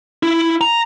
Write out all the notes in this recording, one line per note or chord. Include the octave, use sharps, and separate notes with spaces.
E4
A#5